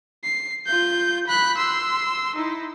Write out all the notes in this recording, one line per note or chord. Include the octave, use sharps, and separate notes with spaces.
C7
F4 G6
B5 F#6
C6 E6
D#4 E4